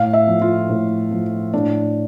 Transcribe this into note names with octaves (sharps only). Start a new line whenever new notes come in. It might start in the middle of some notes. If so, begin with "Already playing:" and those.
Already playing: A2 F5
E5
F3
F4
A2
F3
A2 D4